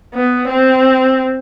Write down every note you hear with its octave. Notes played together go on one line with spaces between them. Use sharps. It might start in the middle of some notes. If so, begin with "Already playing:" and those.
B3
C4